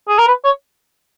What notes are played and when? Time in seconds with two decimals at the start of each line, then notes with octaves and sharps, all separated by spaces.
0.08 G#4
0.18 A#4
0.28 B4
0.45 C#5